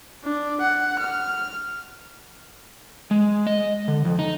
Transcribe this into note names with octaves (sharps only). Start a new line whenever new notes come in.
D4
F#5
F6
G#3
D#5
D3
F2
D#4